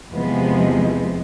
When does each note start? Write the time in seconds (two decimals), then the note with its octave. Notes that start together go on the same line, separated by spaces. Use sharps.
0.13 E2 C3 F3 G#3 B3